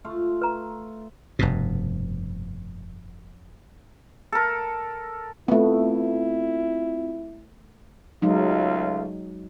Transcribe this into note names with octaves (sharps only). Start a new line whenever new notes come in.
A3 F4 F5
B4 A#5
F1 G2 B2
A4 A#4
A3 B3 C4 E4 F4
C#2 F#3 G#3 A3 D#4 F4